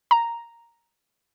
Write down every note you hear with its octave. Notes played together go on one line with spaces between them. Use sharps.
A#5